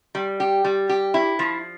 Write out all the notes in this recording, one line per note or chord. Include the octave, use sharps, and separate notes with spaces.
G3
G4
G3
G4
E4
F3